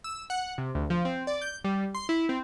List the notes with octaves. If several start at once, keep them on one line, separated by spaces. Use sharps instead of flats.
E6
F#5
C3
D2
F3
C4
D5
G6
G3
C6
E4
C4